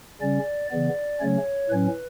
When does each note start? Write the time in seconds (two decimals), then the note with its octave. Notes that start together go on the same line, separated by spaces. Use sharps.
0.21 C#3 G3 C#4 D5
0.71 C#3 E3 B3 D5
1.20 C#3 F#3 A3 C#4 C#5
1.70 A2 F#3 C#4 B4